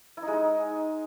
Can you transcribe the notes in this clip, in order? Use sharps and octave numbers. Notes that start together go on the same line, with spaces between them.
E4
D#4
G#3
D#4